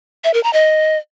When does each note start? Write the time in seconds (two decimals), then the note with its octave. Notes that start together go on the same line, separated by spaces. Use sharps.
0.24 E5
0.34 A#4
0.43 A#5
0.53 D#5